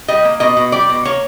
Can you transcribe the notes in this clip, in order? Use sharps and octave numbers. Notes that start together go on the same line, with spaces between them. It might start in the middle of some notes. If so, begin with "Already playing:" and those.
G3 D#5
A#3
B2 D#5
B2
G3 D5
B2
A#3 C#5